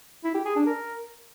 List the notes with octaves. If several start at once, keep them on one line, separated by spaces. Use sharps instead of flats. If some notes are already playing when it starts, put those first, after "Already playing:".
E4
G4
G#4
D4
A#4